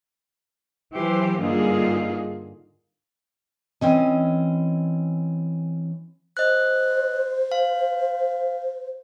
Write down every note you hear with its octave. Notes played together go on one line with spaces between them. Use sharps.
E3 F#3 G4 C5
G2 D3 A#3 D#4 F4 G#4
E3 C4 C#4 D#5
C5 D#5 F#6
F5